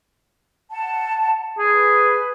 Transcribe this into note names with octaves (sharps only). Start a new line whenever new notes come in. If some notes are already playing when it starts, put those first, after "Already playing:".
F#5 A5
G#4 B4